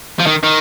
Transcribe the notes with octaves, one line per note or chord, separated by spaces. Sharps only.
F3
D#3
D#3